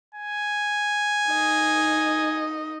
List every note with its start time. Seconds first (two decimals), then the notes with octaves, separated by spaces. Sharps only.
0.15 G#5
1.30 D#4 D#5